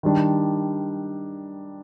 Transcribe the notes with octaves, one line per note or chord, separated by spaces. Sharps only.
D#3 G3 D4